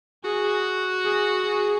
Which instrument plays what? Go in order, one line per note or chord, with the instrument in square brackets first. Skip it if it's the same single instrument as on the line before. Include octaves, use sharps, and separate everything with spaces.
[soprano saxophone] F#4 [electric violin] G#4
[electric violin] G#4
G#4